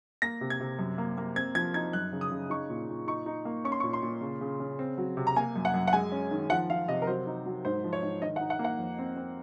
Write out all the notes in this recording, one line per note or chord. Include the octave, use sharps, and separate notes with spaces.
A#3 A#6
C3
G#6
C3
F#2
A#3
A#3
C4 G#6
F3 G#6
D#4 G#6
F#2 F#6
C#3
D#6
C#3
D#4 C#6
A#2
A#2
D#4 C#6
D#4
A#3
C#4 C#6
C6
C#6
A#2
C6
A#2
C#3
C#3
C#3
C4
F#3
C3
A#5
A#3 G#5
F#2
F#5
F#2
F#5
G#3 G#5
C#4
D#3
F3 F#5
F3 F5
C3 D#5
A#4
F#3 C5
D#4
F#3
G#2 C5
F3
C#5
G#2
D#3 D#5
F#5
D#4
F#5
A#3
F#5
F2
C4
C4